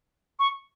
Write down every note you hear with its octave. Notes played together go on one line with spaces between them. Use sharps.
C#6